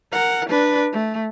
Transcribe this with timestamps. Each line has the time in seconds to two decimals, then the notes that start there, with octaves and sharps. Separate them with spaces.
0.12 A#4 F#5
0.49 D4 B4
0.93 A3